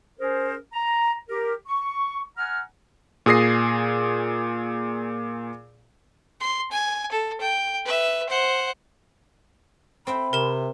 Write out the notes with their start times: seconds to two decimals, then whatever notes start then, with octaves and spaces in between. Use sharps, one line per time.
0.20 C#4 G#4 A#4 C5
0.74 A#5
1.29 G4 A#4
1.67 C#6
2.38 F#5 G#5 A#5 F6
3.26 A#2 G#4 D#6 A#6 C7
6.40 C6
6.72 G#5
7.12 A4
7.41 G5
7.85 B4 E5
8.29 C5 F#5
10.07 C4 E5 G5 B5
10.33 C3 A#4 E7